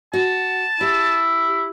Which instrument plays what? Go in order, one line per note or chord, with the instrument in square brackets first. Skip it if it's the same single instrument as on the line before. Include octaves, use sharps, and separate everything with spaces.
[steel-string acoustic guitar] F#4 [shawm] A5
[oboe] E4 [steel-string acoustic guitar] G4